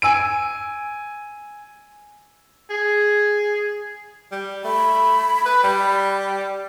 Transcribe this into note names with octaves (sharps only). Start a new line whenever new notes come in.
G#5 E6 D7
G#4
G3
A3 B5
B4
G3